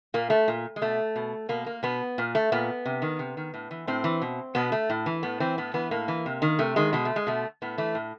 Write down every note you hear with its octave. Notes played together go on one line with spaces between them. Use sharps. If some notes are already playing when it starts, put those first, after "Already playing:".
A#2 A#3
A3
A#2
G#3
B2 A3
B2
B2 A#3
A#3
B2 B3
A#2
A3
A#2 B3
C3
D#3
C3
D#3
A2
E3
A2 C4
E3
B2
B2 B3
A3
A2
E3
A2 B3
E3 C4
A2 B3
E3 B3
A2 A#3
E3
C3
D#3
C3 A3
D#3 G#3
B2 G#3
A3
G#3
B2 A3
A2 B3
E3 A3
A2